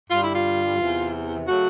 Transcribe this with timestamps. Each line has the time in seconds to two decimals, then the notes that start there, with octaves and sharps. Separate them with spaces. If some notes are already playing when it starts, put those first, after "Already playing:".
0.10 G2 D3 G3 F4
0.23 E4
0.35 F4
0.79 E2 C3 E3
1.48 C#3 F#3 A3 F#4